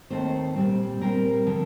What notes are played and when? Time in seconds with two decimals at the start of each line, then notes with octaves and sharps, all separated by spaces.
0.10 D#2 D#3 A3 C4 C5
0.56 A#2 G3 C4
1.01 A#2 G3 C4 A#4
1.46 D3 F3